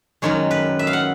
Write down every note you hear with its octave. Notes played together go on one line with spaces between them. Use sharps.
F#2 D#3 G#3 C#5
B4
E5
F5
F#5